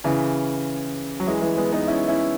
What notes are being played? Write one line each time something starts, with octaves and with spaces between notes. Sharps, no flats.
C#3 E3
F#3
E3 G#3
E3 G#3
G#3 B3
B3 D#4
C#4 E4
C#4 E4